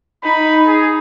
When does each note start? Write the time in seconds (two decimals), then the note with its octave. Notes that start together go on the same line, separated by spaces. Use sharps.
0.23 D#4 B5
0.66 G#4